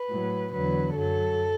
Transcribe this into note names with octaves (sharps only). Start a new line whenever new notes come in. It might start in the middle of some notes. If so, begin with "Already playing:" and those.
Already playing: B4
A2 F#3
E2 D3 F#3 B4
F#2 F#3 A4